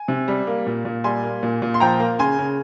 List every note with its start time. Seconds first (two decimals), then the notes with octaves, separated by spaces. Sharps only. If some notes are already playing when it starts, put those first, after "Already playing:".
Already playing: G#5
0.08 C3
0.28 G3
0.47 A#3
0.67 A#2
0.85 A#2
1.04 G3 G#5 C6
1.23 A#3
1.43 A#2
1.62 A#2
1.74 C6
1.80 F3 G5 A#5
2.00 A#3
2.19 C#3 G#5 C6
2.39 C#3